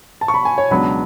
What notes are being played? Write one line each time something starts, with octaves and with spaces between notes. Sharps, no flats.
A5
C#6
B5
G#5
C#5
C#2 B2 F#3 B3 D4 B5